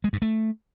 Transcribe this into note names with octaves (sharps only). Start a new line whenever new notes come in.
G#3
G2
A3